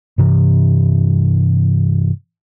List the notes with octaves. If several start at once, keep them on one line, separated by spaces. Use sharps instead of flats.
G2 C3 E3